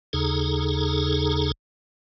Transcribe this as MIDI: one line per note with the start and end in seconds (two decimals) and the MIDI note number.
0.13 1.52 39
0.13 1.52 49
0.13 1.52 63
0.13 1.52 68
0.13 1.52 69
0.13 1.52 82